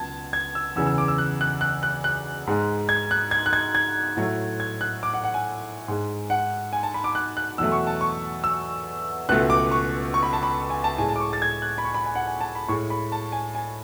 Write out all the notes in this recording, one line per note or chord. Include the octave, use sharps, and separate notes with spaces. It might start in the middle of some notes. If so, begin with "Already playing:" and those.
Already playing: C#2 B2 F#3 A5 G#6
G#6
E6
E2 C#3 E3 E6
E6
D6
E6
F#6
F#6
F#6
F#6
F#6
G#2 G#3
G#6
F#6
G#6
F#6
G#6
G#6
A2 F#3 A3
G#6
F#6
D6
F#5
F#5
G#5
G#2 G#3
F#5
G#5
A5
B5
D6
F#6
F#6
E2 B2 F#3 A3 E6
C#6
A5
C#6
E6
C#2 B2 A3 F#6
D6
C#6
C#6
B5
A5
B5
G#5
A5
A2 G#3 G#5
A5
D6
C#6
A6
G#6
F#6
B5
C#6
B5
G#5
F#5
G#5
A5
B5
A2 G#3 C#6
B5
A5
G#5
G#5